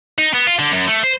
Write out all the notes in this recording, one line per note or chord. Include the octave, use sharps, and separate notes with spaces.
D#4
B3
F4
D3
F#2
A3
C5